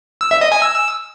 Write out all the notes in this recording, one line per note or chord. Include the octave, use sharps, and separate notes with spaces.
E6
E5
D#5
G#5
E6